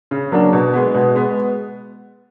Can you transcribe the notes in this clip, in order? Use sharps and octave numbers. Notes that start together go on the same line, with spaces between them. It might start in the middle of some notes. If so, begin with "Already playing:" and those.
C#3
F#3 A#3 D4
B2
G#3 B3
B2
G#3 B3